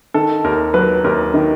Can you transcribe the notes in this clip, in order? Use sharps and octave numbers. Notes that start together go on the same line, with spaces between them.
D#3 A4
D#2 A#4
F#3 B4
D#2 A#4
D#3